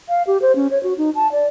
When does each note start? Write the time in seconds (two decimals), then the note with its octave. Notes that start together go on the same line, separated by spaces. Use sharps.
0.09 F5
0.27 G4
0.42 C5
0.56 C#4
0.71 C#5
0.83 F#4
0.98 D#4
1.15 A5
1.32 D5